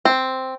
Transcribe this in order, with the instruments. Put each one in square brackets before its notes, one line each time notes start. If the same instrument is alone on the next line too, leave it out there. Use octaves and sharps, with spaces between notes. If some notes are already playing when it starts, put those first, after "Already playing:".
[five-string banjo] C4